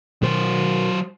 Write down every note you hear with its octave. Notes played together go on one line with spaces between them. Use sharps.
B2 D#3 F#3 C5